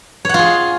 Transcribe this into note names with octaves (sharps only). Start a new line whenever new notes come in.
F4 G#4 C#5 F#5